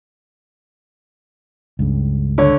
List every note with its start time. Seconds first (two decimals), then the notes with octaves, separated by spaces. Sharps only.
1.79 C#2 G2 C#3
2.38 D3 C#5